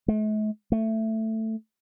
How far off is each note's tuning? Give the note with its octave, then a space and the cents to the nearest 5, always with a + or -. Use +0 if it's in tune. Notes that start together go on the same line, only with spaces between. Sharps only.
A3 -45
A3 +10